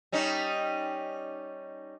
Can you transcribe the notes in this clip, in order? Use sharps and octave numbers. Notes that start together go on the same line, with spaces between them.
G3 C#4 D#4